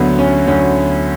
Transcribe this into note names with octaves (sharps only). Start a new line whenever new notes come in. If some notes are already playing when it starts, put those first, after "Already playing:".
Already playing: D2 D3 F#3 B3
C#4
D2 D3 F#3 C#4